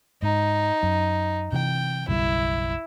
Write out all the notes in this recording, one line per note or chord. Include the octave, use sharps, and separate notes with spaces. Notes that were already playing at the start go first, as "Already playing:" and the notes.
G#2 D#4
F#2
C3 E3 G5
F#1 B1 G3 E4